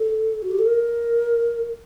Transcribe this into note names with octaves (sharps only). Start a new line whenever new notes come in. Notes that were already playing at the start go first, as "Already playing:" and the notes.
Already playing: A4
F#4
G4
A4
A#4